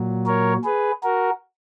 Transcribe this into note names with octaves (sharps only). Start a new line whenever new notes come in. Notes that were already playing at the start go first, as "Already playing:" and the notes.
Already playing: A#2 F#3
A#4 C#5
G#4 B4
F#4 A#4